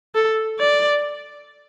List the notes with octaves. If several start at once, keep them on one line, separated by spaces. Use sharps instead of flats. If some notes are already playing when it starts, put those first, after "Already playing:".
A4
D5